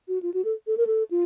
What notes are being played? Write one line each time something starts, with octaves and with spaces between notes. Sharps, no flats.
F#4
F4
F#4
A4
A4
A#4
A4
F4